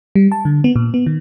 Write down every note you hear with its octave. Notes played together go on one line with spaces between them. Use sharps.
G3
A5
D3
B3
A#2
B3
D#3